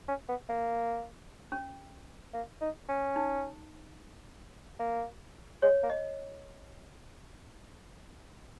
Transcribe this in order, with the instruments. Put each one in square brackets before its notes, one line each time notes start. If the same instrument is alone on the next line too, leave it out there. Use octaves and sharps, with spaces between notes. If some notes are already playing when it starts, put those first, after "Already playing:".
[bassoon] C#4
B3
A#3
[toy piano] C#4
[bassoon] A#3
D#4
C#4
[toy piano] D#4
[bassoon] A#3
[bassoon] G#3 [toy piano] C#5
[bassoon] A#3
[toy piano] D#5